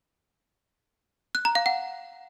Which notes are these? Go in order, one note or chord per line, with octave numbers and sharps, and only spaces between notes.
F#6
A#5
F5
F#5